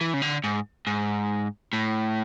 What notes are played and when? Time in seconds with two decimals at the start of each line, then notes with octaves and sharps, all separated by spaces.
0.01 E3
0.14 C#3
0.22 D3
0.44 G#2
0.87 G#2
1.73 A2